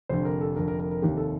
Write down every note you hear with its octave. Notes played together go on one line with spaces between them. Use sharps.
F1 F2 D3 C5
A#4
A4
F1 F2 D3 A#4
A#4
A#4
A#4
F1 D#2 D#3 G4
A4